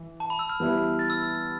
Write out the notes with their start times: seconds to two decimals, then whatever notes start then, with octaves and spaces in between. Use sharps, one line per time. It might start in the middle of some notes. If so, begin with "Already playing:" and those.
Already playing: E3
0.20 A5
0.30 B5
0.39 E6
0.49 F6
0.60 E3 G3 B3 E4
0.99 A6
1.10 E6